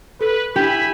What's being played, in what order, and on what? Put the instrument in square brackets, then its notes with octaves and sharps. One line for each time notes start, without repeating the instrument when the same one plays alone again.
[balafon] A4 [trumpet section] B4
[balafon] D4 E4 [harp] G4 [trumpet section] E5 G#5 B5